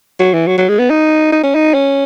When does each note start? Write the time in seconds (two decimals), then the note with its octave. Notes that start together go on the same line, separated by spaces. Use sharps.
0.20 F#3
0.34 E3
0.47 F#3
0.58 F#3
0.69 G#3
0.79 B3
0.90 D#4
1.32 D#4
1.44 C#4
1.55 D#4
1.74 C#4